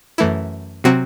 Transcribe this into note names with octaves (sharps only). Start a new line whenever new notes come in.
F#2 E3 A3 E4
C3 F#3 C4 F#4